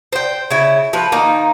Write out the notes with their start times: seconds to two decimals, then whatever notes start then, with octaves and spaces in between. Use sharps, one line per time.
0.13 C5 G5
0.51 C#3 E4
0.93 F3 B4
1.12 D#3 A#3 D#4